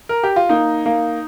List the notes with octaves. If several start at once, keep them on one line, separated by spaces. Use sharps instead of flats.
A#4
G4
F4
A#3 D#4
A#3